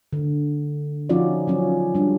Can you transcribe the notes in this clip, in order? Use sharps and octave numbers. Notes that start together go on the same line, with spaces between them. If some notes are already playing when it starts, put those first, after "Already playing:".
D3
F3 C#4 D#4 F4 F#4 D5
F3 F#3 C#4
G3 D4